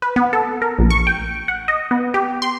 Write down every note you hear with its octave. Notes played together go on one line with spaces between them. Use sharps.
B4
B3
A4
A#4
A#1
C#6
G5
F#5
D#5
B3
G4
C6